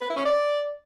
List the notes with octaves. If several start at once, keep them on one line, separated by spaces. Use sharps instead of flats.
B4
E4
C#4
D5